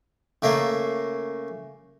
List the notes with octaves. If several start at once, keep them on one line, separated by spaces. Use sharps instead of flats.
C#3 A3 A#3